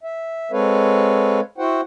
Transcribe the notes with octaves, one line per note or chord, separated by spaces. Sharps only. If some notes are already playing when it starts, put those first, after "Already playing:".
E5
G#3 C4 A4 B4 C#5 F5
E4 F#4 C5 F#5 G5